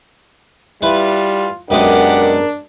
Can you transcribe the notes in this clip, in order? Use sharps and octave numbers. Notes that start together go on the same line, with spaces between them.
G3 E4 F4 B4
F#2 B2 G#3 D4 G4 A#4 F#5